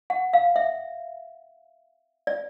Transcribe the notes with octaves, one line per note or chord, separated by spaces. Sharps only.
F#5
F5
E5
D5